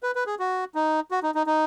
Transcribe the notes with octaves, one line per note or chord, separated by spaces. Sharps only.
B4
B4
G#4
F#4
D#4
F#4
D#4
D#4
D#4